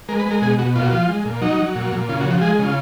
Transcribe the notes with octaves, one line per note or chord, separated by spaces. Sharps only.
G#3 A#4
B4
G#3 A#4
B2 G#4
B2 F#4
A#2 F4
F#4
F3 F4
G#3
A#2
F#3 D#4
F#3
A#2
A#2
C#3 F4
F#4
F3
F#4
G#3 G#4
C#3
F4